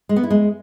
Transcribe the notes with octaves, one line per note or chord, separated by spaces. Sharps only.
G#3
B3
E4
G#3